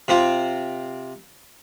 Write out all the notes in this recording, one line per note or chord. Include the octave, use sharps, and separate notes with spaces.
C3 C4 F4